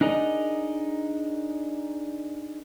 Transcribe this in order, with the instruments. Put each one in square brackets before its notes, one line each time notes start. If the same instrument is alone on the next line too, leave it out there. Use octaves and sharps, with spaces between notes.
[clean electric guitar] D4 D#4 G#4 A#4 D#5